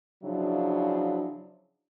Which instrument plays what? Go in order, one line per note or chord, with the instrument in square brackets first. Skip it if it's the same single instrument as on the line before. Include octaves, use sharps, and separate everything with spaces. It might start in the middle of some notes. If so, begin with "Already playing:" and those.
[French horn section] C#3 F3 F#3 D4 E4